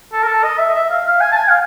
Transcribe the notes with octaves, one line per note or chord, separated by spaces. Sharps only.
A4
A#4
A4
D#5
E5
E5
F5
F5
G#5
A5
G#5
F5